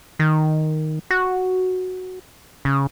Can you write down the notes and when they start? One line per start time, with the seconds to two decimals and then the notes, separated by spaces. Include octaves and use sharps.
0.19 D#3
1.11 F#4
2.65 C#3